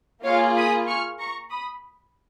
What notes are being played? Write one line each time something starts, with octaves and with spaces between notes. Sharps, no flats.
A#3 F4 G#4 C#5 F5
B5 D#6
C#6 F6
A#5 C#6
B5 D#6